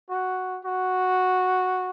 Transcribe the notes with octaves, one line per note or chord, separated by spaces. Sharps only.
F#4
F#4